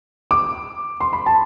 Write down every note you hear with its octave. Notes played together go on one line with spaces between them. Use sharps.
D6
C6
B5
A5